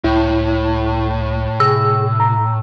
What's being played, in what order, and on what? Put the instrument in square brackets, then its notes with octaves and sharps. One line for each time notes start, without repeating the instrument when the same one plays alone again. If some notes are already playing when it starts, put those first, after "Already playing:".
[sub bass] C#2 [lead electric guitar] A2 [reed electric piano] E4
[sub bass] C3 [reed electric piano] G#4 [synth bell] E6
[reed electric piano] A#5